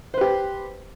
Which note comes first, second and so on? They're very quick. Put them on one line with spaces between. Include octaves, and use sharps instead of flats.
C5 B4 G4